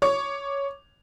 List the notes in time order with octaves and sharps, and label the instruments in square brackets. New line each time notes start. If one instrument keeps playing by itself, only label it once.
[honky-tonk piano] C#5 C#6 D6